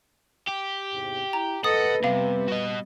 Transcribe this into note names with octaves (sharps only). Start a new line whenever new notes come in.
G4
E2 G#2 C3
E4 A#5
F2 A4 B4 D#5 F#5 D#6
C3 G3 B3 F5
F#4 D#5